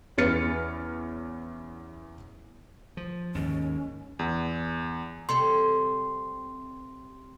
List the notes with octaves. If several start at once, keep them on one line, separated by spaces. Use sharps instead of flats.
E2 C#4 B4 F6 A6 C#7
F3
D#2 G#2 C#4
E2
C3 G3 A4 C6